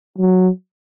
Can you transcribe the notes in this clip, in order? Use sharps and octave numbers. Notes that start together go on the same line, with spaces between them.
F#3